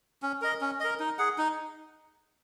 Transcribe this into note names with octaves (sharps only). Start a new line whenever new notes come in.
C#4
A#4 D#5
C#4
A#4 D#5
D#4
G#4 F#5
D#4